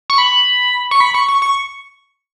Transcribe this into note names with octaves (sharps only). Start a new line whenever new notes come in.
C#6
B5
C#6
B5
C#6
C#6
C#6